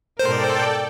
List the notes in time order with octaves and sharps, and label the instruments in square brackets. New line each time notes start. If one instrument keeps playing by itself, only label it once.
[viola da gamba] G#2 B2 A#4 [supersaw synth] A4 D5 G5 [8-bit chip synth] C5